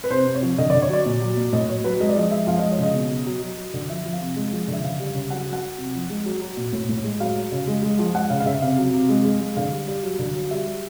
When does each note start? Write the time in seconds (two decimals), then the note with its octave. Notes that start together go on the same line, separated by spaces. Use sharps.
0.04 B4
0.11 C3 C5
0.27 C3
0.35 C#5
0.42 F3
0.58 D3 D#5
0.70 D3 D5
0.82 C#5
0.90 F#3 D5
1.06 A#2
1.22 F#3
1.37 A#2
1.53 A2 D#5
1.69 F#3 C#5
1.84 F#3 B4
2.00 G#3 D#5
2.09 D5
2.16 F3 D#5
2.31 G#3 E5
2.47 F3 F5
2.59 G#3 D#5
2.71 C#5
2.79 C#3 D#5
2.95 B2
3.10 F#3
3.26 F#3
3.42 F#3
3.57 F#3
3.73 D3
3.89 F3 E5
4.05 F3
4.13 F5
4.21 C3
4.36 G#3
4.53 F3
4.68 D3
4.73 E5
4.83 C#3 F5
5.00 G3
5.07 F5
5.15 C#3
5.30 F#3 F#5
5.47 F#3
5.53 F#5
5.63 F#3
5.78 C3
5.95 F3
6.10 G#3
6.26 F#3
6.41 F#3
6.57 A#2
6.73 A2
6.89 A2
7.04 G#3
7.20 F#3 F5
7.36 F#3
7.52 C#3
7.68 G#3
7.83 G#3
7.99 F3
8.15 G#3 F#5
8.30 C#3 F5
8.40 F5
8.46 C#3 E5
8.62 C3 F5
8.78 F#3
8.94 C3
9.09 G#3
9.25 G#3
9.41 G#3
9.56 D3 F5
9.72 G3
9.88 G3
10.03 F#3
10.19 D3
10.35 F#3
10.51 G3 E5
10.67 G3